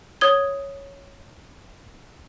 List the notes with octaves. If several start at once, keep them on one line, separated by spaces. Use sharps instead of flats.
C#5 D#6 G#6 G7